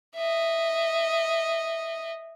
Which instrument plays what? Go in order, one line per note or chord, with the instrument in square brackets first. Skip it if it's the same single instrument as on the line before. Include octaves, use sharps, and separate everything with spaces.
[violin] D#5 E5